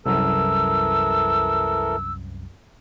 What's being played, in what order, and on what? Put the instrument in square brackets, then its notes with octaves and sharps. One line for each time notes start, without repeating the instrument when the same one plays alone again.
[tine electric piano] C2 F#2 [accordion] E3 A4 A#4 [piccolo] E6